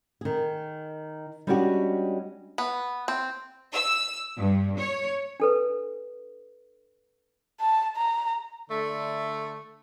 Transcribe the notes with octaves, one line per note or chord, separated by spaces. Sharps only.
D#3 G#4
G3 G#3 C#4 D4 F#4 G4
B3
C4
E6
G2
C#5
D4 A4 B4
A5
A#5
D3 A3